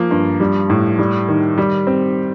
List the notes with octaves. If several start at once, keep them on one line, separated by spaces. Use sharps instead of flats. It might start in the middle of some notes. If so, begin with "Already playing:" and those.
Already playing: F3 A#3
G2
G3
A2
G3
D#3
G3
C4